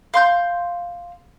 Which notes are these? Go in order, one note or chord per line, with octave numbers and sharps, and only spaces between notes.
F5 C6 G6